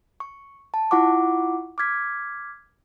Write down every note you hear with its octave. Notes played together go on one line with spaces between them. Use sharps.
C#6
A5
E4 F4 F#5 C#6 D6
D6 F6 G#6 B6